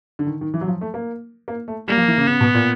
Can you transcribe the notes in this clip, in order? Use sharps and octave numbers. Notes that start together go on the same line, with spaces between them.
D3
D#3
D#3
E3
F#3
F3
A3
A#3
A#3
A3
G3 A#3
F3
E3
C#3
C#3 B3
B2
A#2